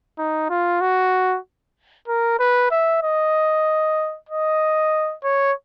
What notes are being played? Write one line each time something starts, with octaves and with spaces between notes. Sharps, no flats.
D#4
F4
F#4
A#4
B4
E5
D#5
D#5
C#5